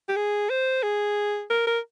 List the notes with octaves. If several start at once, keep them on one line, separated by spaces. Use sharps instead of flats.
G4
G#4
C5
G#4
A#4
A#4